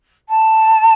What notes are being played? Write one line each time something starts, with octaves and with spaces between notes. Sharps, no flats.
A5